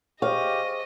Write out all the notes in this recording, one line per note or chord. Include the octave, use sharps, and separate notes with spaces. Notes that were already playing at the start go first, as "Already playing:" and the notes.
G4 G#4 C5 D#5 F5 C#6